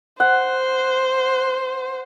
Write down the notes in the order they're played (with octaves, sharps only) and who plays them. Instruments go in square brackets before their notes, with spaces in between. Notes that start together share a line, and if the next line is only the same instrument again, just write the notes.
[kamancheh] C5 [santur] F#5